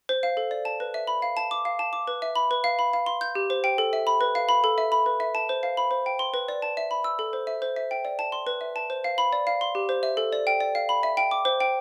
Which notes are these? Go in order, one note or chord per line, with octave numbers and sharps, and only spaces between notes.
C5
F5
A4
D5
A5
B4
E5
B5
F5
A5
D6
F5
A5
D6
B4
E5
B5
B4
F5
B5
F5
C6
G6
G4
C5
G5
A4
E5
B5
B4
F5
B5
A4
E5
B5
B4
E5
A5
C5
F5
B5
C5
G5
C6
B4
D5
A5
E5
B5
E6
A4
C5
E5
C5
E5
G5
D5
A5
C6
B4
E5
A5
C5
F5
B5
D5
F5
C6
G4
C5
E5
A4
D5
G5
D5
F5
B5
E5
G5
D6
C5
G5